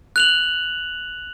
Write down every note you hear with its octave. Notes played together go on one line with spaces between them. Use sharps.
F#6 F7 F#7